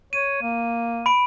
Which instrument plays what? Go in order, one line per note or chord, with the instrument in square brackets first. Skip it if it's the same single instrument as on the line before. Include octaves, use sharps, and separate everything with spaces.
[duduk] C#5 [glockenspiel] D#7
[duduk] A#3
[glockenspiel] B5 D7